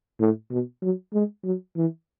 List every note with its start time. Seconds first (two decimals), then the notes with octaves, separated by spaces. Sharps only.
0.20 A2
0.51 B2
0.82 F#3
1.13 G#3
1.44 F#3
1.76 E3